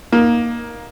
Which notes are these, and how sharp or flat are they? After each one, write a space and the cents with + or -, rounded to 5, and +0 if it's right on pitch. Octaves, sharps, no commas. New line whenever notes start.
A#3 +15 D#4 +0